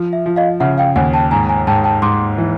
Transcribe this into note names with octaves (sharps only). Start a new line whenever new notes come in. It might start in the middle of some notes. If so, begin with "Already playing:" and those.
Already playing: F3
E5
F3
D#5 F5
C#3 E5 F#5
F5 G5
D#2 F#5 G#5
G5 A5
G#2 G#5 A#5
G#5 A#5
G#2 G5 A5
G5 A5
G#2 C6 D6
E3